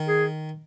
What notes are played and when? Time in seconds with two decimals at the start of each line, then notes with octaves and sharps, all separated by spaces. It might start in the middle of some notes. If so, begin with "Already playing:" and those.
Already playing: D#3
0.08 G#4